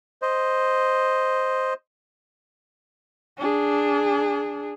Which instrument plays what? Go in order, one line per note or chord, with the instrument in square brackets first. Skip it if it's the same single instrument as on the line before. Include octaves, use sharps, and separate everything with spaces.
[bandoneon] C5 D#5
[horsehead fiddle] D4 G#4